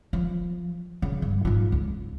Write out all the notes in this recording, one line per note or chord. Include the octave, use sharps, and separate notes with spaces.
F3
C#3
G2
G#2 F4
C#2